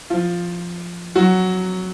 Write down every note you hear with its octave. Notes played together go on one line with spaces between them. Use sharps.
F3 F4
F#3 F#4